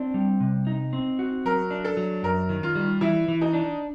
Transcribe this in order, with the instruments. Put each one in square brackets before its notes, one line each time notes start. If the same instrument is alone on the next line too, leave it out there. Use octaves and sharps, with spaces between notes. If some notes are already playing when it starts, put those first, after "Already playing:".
Already playing: [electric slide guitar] C4 D4
G3
C3
D#4
C4
F#4
[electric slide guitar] F#3 [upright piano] A#4
[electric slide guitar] D4
[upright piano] A4
[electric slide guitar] F#3
[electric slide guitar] F#2 [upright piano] A#4
[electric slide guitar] D#3
[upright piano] F4
[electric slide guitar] G3
[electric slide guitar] E3 [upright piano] E4
[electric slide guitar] E3
[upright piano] D#4
[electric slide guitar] D4